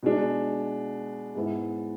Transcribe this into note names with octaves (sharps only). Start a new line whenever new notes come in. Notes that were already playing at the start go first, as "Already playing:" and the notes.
B2 G#3 D4
G#2 G#3 B3 E4